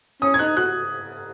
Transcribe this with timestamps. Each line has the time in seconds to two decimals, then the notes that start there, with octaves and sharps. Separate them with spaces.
0.22 C#4 D#6
0.34 G#6
0.39 D#4 F#6
0.57 F#4 F#6